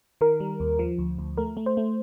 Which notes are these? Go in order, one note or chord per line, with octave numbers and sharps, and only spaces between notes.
D#3 A#4
G3
D#2
F3
D2
D2
A3 A#4
A3
C5
A3